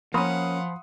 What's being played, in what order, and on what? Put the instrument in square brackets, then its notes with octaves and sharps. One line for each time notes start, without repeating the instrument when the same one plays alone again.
[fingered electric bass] F3 [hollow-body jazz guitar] A#3 C#4 [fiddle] F5 F#5 [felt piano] B5 C6 D#6